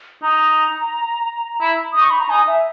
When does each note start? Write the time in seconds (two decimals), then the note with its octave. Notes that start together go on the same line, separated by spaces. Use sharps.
0.23 D#4 A#5
1.61 E4
1.92 D#4 D#6
2.01 C#6
2.10 B5
2.20 A#5
2.29 D#4 G#5
2.47 E5